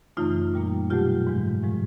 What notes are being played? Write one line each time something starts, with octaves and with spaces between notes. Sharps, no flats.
F#2 C#3 E3 A3 D#4 F4
A#2 G3 A#3
B2 F#3 A3 F4 G4
G#2 E3 G#3
A2 F3 G#3